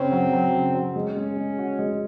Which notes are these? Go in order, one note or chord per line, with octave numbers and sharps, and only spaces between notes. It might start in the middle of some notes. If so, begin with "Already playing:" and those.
Already playing: C#3 C4 C#4
F#3
F#3
C#3
F#3
G#3 C#4
G#3
G#3
F#4
G#3